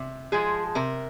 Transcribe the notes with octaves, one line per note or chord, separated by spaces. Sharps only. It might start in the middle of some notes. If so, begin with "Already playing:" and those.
Already playing: C3
F3 G#3 G#4
C3 A#4